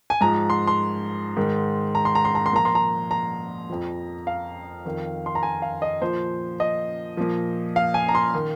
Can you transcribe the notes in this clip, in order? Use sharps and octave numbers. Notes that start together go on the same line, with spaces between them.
G#5
G#2 F3 A#5
C6
C6
G#2 D#3
A#5
C6
A#5
C6
A#5
C6
A#2 F3 A#5
C6
A#5
A#5
F2 F3
F5
F2 D#3
C6
A#5
G#5
F5
D#5
A#2 F3 C5
D#5
A#2 F3
F5
G#5
A#5
C6
D#3